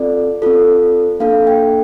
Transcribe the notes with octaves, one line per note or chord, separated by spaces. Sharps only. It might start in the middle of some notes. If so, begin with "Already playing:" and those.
Already playing: C4 F4 A4 D5
C4 F4 A4
A#3 D4 A4 F5
G5